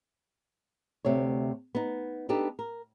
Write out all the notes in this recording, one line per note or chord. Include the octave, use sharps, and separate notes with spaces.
D2 C3 A3 C#5
B3 D#4
B3 D4 D#4 G4 A4
A#4